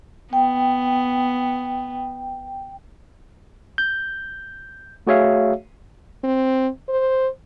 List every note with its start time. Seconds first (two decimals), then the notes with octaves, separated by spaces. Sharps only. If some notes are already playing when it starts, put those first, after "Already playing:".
0.33 B3 G5
3.78 G6
5.07 A3 F#4 G#4 C#5 E5 F5
6.24 C4
6.89 C5